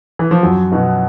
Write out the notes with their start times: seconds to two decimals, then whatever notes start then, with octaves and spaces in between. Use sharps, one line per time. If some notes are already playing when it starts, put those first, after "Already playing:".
0.19 E3
0.31 F3
0.43 F#2 F#3
0.72 B2 B3